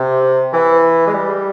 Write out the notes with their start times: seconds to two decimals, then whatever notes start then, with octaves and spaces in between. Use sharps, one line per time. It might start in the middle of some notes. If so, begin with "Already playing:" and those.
Already playing: C3
0.53 E3
1.07 G#3
1.14 G3